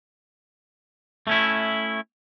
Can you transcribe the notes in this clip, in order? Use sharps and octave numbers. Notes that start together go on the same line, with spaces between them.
A3 C#4 E4